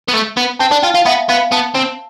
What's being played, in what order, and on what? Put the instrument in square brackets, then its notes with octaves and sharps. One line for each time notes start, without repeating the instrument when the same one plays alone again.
[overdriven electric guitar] B3
A3
B3
[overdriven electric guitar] C4 [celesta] A5
[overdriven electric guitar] D4 [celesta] A5
[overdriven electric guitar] F4 [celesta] G5
[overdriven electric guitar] F4 [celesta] F5
[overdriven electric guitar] B3 [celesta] E5
[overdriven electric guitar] B3 [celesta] F5
[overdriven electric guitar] B3 [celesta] A5
[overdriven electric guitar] C4